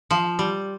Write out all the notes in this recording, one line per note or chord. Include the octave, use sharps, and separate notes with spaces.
F3
G3